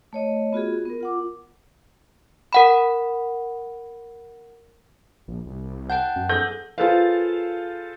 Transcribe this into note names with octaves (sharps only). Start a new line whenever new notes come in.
A3 C#5 D#5
B3 F4 F#4 G#4
B3 A#4
F4 F#5 D6
A#4 F#5 B5
A#1
C2
F#5 G5 A5 G6
F#2
G#4 A4 G6
F4 G#4 A4 B4 C5 F5